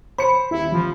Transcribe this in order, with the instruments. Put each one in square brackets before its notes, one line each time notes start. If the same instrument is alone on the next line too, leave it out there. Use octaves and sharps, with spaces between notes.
[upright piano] C5 C#7 [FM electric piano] B5
[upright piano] D#1 [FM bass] E4
[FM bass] F3